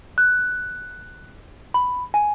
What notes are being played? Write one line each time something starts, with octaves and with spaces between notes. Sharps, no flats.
F#6
B5
G#5